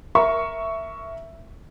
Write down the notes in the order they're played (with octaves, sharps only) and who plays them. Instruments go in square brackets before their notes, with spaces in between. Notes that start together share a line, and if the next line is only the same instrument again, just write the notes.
[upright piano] A#4 E5 C#6